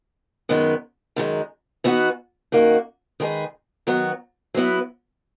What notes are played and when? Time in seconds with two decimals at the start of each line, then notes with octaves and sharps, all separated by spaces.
0.49 F#2 D#3 G#3 B3
1.16 F#2 D#3 G#3
1.84 E3 B3 D#4 F#4
2.52 F#2 D#3 A#3 D#4 F#4
3.20 D#3 G#3 D#4 G#4 B4
3.87 D#3 F#3 B3 F#4
4.54 F#3 B3 E4